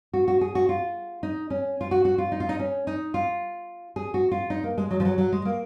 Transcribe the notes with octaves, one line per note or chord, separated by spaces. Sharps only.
F#4
F#4
G#4
F#4
F4
D#4
C#4
F4
F#4
F#4
F4
D#4
F4
D#4
C#4
D#4
F4
G#4
F#4
F4
D#4
A#3
G#3
F#3
F3
F#3
F#3
G#3
A#3